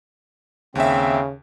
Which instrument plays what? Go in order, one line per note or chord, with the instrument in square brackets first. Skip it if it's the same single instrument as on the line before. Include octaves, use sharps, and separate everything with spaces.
[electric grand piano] D#2 E5 [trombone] C#3 [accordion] C4